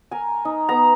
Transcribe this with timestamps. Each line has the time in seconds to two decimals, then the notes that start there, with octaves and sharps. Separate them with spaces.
0.11 A#4 G#5
0.45 D#4
0.69 B3 A#5